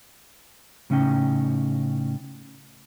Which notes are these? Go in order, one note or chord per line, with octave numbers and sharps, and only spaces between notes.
A2 C#3 C#4 D#4 G5